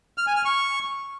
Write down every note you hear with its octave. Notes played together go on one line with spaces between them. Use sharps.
F6
G#5
F6
C#6